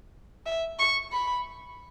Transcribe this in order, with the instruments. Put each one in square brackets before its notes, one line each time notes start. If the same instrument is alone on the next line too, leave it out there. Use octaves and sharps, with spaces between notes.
[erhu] E5
C#6
B5